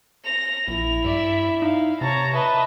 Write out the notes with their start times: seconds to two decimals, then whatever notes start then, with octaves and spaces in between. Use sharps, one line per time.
0.24 A#6 F7
0.68 A#1 E4 F7
1.05 G2 D5 E5
1.62 D#4 F5
2.01 C3 C#5 A5 A#5
2.33 B4 D#5 E5 A5